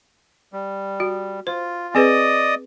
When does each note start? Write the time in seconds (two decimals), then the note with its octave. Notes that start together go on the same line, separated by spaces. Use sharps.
0.53 G3
1.00 F#4
1.47 F4 C5
1.95 C4 G#4 B4 D5 D#5 D#6